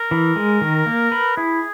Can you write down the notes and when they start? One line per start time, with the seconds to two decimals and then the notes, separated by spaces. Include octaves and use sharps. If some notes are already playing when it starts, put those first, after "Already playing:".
Already playing: A#4
0.11 E3
0.36 G#3
0.61 D#3
0.86 A#3
1.12 B4
1.37 E4 G#4